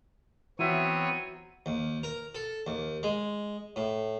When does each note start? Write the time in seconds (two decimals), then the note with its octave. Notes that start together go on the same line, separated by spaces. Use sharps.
0.59 E3 F#3 B3 C4 C#5 E5 D#7
1.66 D#2
2.03 A#4
2.35 A4
2.67 D#2
3.03 G#3
3.76 A2